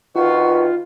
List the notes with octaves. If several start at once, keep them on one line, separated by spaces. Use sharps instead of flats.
D2 D#3 F4 F#4 B4